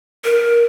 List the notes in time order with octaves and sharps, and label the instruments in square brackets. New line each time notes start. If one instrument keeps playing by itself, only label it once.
[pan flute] A#4